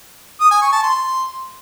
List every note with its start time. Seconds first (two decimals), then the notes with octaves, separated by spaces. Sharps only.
0.41 D#6
0.51 G#5
0.62 C#6
0.73 A5
0.83 C6